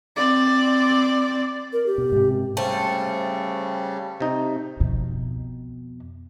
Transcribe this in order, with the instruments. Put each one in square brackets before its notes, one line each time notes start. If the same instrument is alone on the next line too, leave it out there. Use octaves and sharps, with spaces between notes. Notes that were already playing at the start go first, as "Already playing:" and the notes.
[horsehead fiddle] C4 D5
[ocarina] A#4
G4
[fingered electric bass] B2
G#2 C3
[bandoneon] C#3 G3 [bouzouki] A3 [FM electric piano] C5 G5 A5
[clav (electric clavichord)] C3 D#4
[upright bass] F2 B2